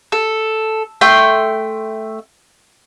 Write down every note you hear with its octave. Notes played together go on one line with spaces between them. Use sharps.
A4
A3 G5 C6